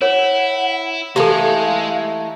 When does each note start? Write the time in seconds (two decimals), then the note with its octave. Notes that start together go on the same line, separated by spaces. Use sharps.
0.02 E4 C#5 F#5
1.16 E3 G#3 A3 D#4 G4 A4 F5